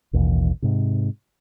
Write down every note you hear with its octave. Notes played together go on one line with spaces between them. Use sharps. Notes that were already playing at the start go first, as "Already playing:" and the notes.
A1 D#2 B2 E3
G#2 C3